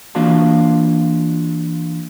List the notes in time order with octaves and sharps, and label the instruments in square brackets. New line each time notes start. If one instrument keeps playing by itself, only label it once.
[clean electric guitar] E3 A#3 D4 F4 F#4 A5